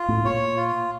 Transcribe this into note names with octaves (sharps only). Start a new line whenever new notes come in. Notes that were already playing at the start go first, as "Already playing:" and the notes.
Already playing: F4
A2
A#2 C#5
F4